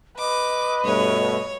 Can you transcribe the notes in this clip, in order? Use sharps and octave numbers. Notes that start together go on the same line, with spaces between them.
B4 D#5 D6
G2 B2 A3 C#5